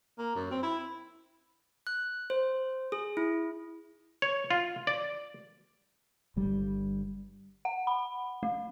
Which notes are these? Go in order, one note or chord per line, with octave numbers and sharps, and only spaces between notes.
A#3
F#2
C4
E4
F#6
C5
G#4
E4
C#5
F4
D5
G1 G2 G3
F#5
B5
A3